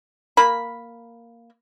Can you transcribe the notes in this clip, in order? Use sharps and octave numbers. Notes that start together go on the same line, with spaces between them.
A#3 B5